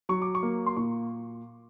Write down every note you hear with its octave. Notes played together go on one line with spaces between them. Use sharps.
F#3 C#6
D6
C#6
A#3
C6
A#2 C#6